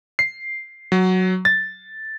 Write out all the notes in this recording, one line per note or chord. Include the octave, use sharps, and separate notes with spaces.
C7
F#3
A6